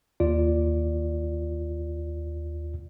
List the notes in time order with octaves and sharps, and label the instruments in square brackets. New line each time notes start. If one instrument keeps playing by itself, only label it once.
[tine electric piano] D#2 F4 D5